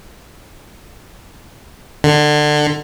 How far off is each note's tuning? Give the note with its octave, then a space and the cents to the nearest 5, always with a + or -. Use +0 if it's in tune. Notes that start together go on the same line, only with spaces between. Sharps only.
D3 +25